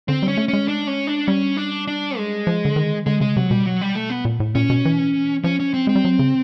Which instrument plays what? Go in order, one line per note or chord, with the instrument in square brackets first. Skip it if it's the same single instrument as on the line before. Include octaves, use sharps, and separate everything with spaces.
[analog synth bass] D3 [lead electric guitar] C4
[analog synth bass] G3
[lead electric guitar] C#4
[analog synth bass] A3
[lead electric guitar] C#4
[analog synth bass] G#3
[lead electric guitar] D4
C#4
D4
[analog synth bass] G3 [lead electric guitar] C#4
[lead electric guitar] D4
D4
G#3
[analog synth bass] F3
D3
D#3
[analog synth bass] D3 [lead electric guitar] G#3
[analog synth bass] C#3 [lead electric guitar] G#3
[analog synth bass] C3 [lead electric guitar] F#3
[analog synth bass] B2 [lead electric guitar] G3
[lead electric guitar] F#3
G3
A3
B3
[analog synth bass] A#2
A2
[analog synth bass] A#2 [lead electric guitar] C#4
[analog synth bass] B2
E3
[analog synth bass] F3 [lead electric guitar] C#4
[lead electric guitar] C#4
C4
[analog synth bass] G#3 [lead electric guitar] C4
[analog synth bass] G3
F#3
C#3